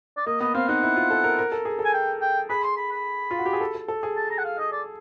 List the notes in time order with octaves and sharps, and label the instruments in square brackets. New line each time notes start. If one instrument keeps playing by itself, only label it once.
[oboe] D5
[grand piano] A#3 [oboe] D#5
[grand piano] B3 [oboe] D#5
[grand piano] C4 [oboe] F5
[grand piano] D#4 [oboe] F#5
[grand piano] E4
F4
A4
A#4
A#4
A4
G#4
A4
[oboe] G#5
G5
G5
[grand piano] G#4 [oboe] B5
[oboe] C6
B5
B5
[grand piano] F4
F#4
G4
G#4
A4
A4
A4
G#4
[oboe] A5
A#5
F#5
F5
D#5
D5